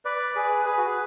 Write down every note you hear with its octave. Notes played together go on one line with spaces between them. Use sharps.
B4 D5
G#4 B4
G#4 B4
F#4
G#4